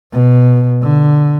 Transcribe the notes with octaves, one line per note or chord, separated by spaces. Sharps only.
B2
D3